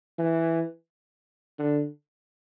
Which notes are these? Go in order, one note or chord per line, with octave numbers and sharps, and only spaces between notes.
E3
D3